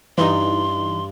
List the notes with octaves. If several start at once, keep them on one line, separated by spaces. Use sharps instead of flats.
G2 E3 D#4 C6